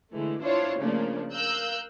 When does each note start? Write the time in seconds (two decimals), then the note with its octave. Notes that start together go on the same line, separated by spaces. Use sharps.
0.12 D3 E3 G#3 A3
0.41 D4 E4 F4 C5 C#5
0.79 C#3 F3 A3 A#3 D4
1.33 A#4 F5 E6 F#6 G6